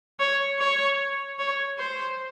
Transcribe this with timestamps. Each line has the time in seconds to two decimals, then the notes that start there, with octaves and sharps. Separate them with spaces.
0.20 C#5
0.59 C#5
1.39 C#5
1.78 C5